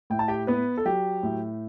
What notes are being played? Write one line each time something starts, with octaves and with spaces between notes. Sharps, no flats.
A2 G5
A5
G4 G5
B3 B4
A4
F#3 G4
A2